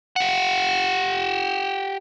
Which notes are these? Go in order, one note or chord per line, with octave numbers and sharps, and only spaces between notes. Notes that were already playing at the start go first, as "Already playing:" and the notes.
G4 F#5